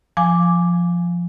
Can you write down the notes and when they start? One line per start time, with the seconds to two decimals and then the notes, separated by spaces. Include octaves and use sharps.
0.17 F3 G#5 D6